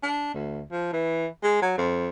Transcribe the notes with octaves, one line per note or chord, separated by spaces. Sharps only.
D4
D2
F3
E3
G#3
F#3
F2